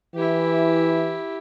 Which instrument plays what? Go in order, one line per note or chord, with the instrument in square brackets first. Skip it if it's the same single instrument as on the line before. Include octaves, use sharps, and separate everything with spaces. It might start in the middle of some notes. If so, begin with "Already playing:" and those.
[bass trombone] E3 [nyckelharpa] E4 G4